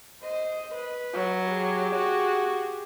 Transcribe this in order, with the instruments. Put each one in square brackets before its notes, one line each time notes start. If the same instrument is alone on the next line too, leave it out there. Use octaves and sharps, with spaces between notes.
[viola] C5 [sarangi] D#5
[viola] B4
[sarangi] F#3
[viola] G4 G#4
[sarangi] F#4